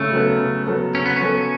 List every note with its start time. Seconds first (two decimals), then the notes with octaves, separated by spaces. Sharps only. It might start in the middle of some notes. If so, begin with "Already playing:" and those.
Already playing: C#3 A3
0.13 F#3 B3 A4
0.39 C#3
0.67 F#3 B3 A4
0.94 C#3 C#4
1.06 B3
1.16 C#4
1.22 F#3 B3 A4